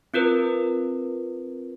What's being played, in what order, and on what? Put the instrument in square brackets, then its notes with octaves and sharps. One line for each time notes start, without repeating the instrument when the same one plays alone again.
[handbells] C4 F4 A#4 B4